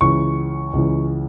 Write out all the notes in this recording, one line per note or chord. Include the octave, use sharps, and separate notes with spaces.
C#2 C#3 E3 C#6
C#2 C#3 E3